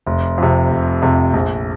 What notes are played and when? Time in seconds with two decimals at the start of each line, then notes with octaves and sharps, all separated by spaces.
0.06 F1
0.38 F2 C3
0.70 F1
1.02 F2 C3
1.33 A#1